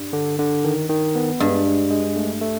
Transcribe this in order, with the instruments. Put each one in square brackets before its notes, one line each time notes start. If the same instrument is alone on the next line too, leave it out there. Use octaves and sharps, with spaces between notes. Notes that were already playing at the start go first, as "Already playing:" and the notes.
Already playing: [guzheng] G2
[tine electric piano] D3
D3
D#3
D#3
B3
[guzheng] G2 [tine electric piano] G#3
[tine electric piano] G#3
G#3
A3
A3